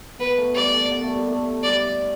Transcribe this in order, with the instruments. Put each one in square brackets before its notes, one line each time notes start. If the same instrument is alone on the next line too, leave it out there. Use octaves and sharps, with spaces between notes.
[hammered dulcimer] B3 [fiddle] B4
[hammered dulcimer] A3
[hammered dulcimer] G3 [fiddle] D5
[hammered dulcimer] A3
B3
A3
G3
A3
[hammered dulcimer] G3 [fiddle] D5